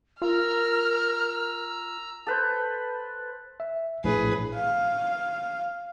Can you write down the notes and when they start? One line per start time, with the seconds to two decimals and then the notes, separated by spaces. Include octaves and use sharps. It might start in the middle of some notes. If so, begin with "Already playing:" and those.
0.22 F4 A#4 A#5 E6 F6
2.27 A4 B4 C5
3.60 E5
4.04 A#1 A2 G#4 B4
4.55 F5